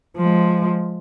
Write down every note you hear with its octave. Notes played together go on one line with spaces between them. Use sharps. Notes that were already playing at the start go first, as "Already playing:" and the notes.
F3 G#3